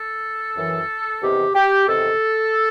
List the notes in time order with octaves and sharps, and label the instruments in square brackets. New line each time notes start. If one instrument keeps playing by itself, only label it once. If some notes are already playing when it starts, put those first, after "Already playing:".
Already playing: [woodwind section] A4
F#2 E3
E2 C3 D#3 G4
G4
E2 C3 D#3 A4